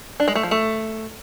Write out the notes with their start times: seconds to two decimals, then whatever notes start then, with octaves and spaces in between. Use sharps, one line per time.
0.20 D4
0.28 G#3
0.35 A3
0.43 F3
0.51 A3